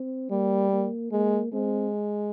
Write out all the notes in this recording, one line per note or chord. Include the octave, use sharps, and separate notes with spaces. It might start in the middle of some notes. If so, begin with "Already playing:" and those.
Already playing: C4
G3 A#3
A#3
G#3 A#3
G#3 C4